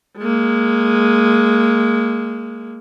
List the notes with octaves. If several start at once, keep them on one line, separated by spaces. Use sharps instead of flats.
G#3 A#3